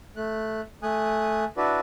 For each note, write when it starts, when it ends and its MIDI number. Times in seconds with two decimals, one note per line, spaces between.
0.16 0.61 57
0.16 0.61 90
0.83 1.44 57
0.83 1.44 80
0.83 1.44 87
0.83 1.44 90
1.57 1.80 62
1.57 1.80 64
1.57 1.80 66
1.57 1.80 71
1.57 1.80 74